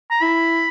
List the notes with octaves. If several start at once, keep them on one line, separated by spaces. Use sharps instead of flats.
A#5
E4 B5